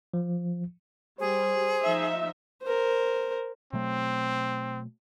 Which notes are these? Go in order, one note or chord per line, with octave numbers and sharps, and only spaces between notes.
F3
G3 G#4 C5
F3 D#4 E5
A#4 C5
B2 F#3 A3 C4